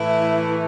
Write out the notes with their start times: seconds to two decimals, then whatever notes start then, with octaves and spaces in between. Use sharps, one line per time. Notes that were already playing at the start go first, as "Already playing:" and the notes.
Already playing: A2 E3 A3 E4